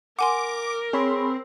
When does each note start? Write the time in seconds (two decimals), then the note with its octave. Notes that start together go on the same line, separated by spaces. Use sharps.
0.19 A#4 F#5 G#5 C6 D6
0.93 C4 G#4 C#5 B5